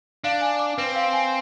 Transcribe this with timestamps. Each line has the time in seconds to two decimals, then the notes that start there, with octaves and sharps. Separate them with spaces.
0.24 D4 F5
0.41 G#5
0.59 D6
0.78 C4 B4
0.96 F5
1.13 G#5